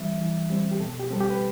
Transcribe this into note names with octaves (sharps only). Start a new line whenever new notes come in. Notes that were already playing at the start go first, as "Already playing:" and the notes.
Already playing: E3 G3 C4 E5
E3
G3 C4
G4
B2 A4
G4
G3 C4 A4
G4
B4